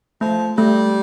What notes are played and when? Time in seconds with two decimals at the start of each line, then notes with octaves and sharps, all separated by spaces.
0.21 F3 A3
0.57 G3 A3